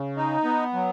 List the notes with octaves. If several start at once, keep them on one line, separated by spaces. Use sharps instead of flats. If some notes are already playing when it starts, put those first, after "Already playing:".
Already playing: C#3
D#4
B3
F#3